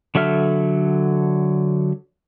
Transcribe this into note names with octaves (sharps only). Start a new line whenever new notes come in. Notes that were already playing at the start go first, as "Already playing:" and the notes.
D3 F#3 A4 E5 F6